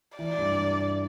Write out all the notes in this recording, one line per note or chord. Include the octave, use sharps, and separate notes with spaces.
E3 D5
G2